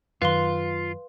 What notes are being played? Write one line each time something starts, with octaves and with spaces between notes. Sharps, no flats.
F#2 D#3 F4 B4 F5 C6